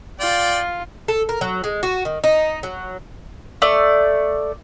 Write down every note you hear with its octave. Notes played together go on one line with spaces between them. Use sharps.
F4 D5 G5
A4
A#4
F#3
G#3
F#4
D#3
D#4
F#3
A3 D5